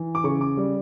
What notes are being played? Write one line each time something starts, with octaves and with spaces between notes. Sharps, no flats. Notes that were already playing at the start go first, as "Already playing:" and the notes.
Already playing: E3
D6
C#3 C#6
D6
G3